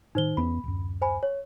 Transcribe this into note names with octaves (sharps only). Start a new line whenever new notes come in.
A2 D#3 D#4 C5 G7
E2 B3 C#4 B5
D1 F#2
C5 G#5 B5
C#5